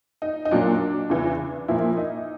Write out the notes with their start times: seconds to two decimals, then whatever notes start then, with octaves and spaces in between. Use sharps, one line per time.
0.22 D#4
0.45 D#4
0.51 A#2 F#3 A#3 D4
1.10 E2 C#3 E3
1.68 A#2 F3 A#3 E4
1.97 D#4